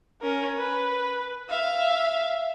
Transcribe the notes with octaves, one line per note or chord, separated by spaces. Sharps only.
C#4 A#4
B4
E5 F5